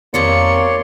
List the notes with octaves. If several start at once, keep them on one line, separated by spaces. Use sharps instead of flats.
F2 C3 D#3 A#3 C#5 D5 C6 C#7